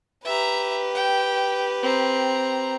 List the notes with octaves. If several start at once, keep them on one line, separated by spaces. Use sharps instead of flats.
G4 B4 E5 A#5
G5
C4 A#5